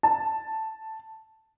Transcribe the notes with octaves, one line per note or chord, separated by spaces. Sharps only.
A5